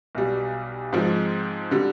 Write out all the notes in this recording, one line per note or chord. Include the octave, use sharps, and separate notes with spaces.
B1 B2 G3
G#2 F3 G#3 C4
D3 G3